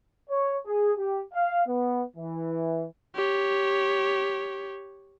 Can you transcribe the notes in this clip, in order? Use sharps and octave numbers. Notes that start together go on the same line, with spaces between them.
C#5
G#4
G4
F5
B3
E3
G4 C#5